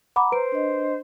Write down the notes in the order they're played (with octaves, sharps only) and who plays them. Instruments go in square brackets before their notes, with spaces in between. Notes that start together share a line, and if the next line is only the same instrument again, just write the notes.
[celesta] F#5 B5 D6 [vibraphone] A#5
[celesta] B4 D7 [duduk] C5
[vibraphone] D4 D#5